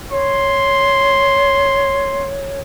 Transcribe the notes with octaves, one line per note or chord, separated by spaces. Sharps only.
C#5 C6